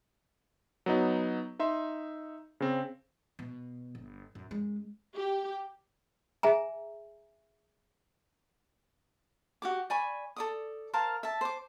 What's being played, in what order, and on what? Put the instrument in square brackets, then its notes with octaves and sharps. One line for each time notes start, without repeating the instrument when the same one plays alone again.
[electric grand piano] F#3 B3 D#4
D#4 E5 C6
C#3 C4
[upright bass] B2
G1
F#2
F#2 G#3
[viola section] G4
[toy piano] G#4 E5 G#5 A#5
[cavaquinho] F#4 G4 D6
D5 G#5 B5 C#6
A4 D5 D#6
A#4 C5 F5 A5
E5 A5
C5 D6